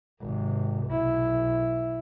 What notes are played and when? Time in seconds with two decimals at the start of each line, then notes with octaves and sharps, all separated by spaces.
0.21 G#1 C3
0.87 B1 E4